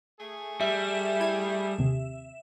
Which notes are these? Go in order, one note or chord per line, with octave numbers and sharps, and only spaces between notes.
A3 G#4
G3 E5
E4 G#6
D#2 C3